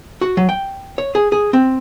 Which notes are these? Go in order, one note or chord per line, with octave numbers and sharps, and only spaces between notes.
F#4
F#3
G5
C#5
G#4
G#4
C4